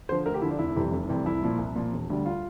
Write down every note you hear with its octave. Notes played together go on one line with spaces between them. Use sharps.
D3 F3 C5
D2 A#4
G4
D3 F3 E4
D4
F1 E4
F2 C3 E3 G3
F1
F2 C3 E3 G3
C2 E4
A#2 F3
C2
A#2 F3
E1
D2 D3 G3
F4